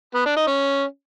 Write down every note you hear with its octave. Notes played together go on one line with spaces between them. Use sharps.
B3
D4
D#4
C#4